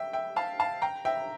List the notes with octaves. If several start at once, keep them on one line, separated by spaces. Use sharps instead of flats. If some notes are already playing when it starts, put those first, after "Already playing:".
Already playing: E5 G5
E5 G5
F5 A5
F5 A5
G5 A#5
E5 G5